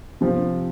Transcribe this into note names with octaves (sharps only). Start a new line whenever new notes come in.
C3 F3 C4